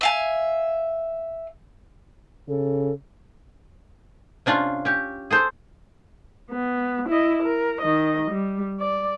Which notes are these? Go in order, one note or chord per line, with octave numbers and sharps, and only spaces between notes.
E5 F5 G#5
C#3 A4
C3 C#4 D4 F4
C#4 G4
G#4 A4 C5
B3
E4 D#5
A#4
D#3 D#5
G3
D5